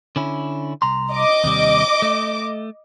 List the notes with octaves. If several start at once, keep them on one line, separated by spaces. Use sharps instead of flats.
D3 C#4 E4
C2 A#5 C6
D#5 D6
D#2 C3 G3
A3